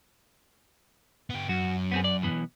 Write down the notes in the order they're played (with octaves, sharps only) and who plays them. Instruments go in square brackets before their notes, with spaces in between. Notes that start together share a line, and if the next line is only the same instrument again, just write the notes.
[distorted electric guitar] B3 G4
[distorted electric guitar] F#2 [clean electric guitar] F#4
[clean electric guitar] B3 C4 G#4
D5
B1 E3 B3